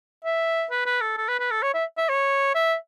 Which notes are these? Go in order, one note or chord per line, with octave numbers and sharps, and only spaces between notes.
E5
B4
B4
A4
A4
B4
B4
A4
C#5
E5
E5
C#5
E5